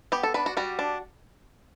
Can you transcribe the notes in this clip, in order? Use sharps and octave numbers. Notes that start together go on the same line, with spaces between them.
B3 G4
A4
D4 B4
F#4
G3 F#4
D4